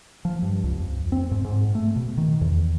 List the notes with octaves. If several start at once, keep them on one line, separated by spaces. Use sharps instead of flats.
F3
G2
C#2
F2
C4
G#2
G#2
A3
B2
D#3
E2